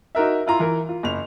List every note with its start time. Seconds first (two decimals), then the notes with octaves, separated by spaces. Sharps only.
0.15 D#4 F#4 A#4 E5
0.46 E4 F4 A#5 C6
0.59 E3 A#4
0.89 F4
1.03 F#1 F7